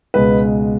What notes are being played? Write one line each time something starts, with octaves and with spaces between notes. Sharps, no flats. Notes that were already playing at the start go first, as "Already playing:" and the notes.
C#2 B2 G#3 B4